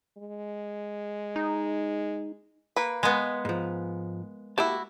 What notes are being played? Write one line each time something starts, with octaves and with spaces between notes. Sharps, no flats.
G#3
D#4
A#3 B4
G#3 B3
G#2 F3
A#3 E4 F#4 G4 A5